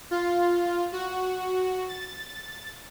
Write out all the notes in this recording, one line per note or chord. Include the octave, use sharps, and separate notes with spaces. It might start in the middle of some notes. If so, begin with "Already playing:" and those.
F4
F#4
A6